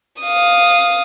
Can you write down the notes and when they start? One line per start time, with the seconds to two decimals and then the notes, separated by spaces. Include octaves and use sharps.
0.22 F5 D#6